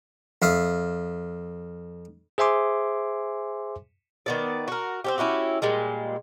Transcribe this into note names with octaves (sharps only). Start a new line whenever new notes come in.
F2 E5 F5 D#6
G#4 C5 E5 G#5 C6 D6
D#3 B3 D5
F#4 A#4
C4 C#4 G4
C#4 E4 F#4 G4
A#2 G3 G#3